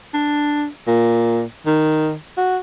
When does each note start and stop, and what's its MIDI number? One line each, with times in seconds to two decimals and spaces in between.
0.14 0.66 62
0.88 1.43 46
1.66 2.15 51
2.38 2.58 66